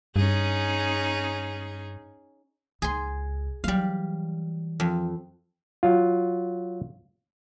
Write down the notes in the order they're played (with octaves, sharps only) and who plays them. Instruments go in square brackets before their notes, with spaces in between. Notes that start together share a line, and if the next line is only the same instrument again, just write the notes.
[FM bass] G2 [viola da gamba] C#4 D#4 G#4
[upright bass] C#2 [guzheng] G#4 C6
[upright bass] E3 F#3 [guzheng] G3 F5
[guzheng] F2
[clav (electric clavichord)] F#3 F4